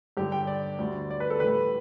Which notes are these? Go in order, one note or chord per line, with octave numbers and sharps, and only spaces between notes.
G2 D3 G3 G4
G5
D5
D2 D3 G3
D5
B4
A4
A2 E3 G3 B4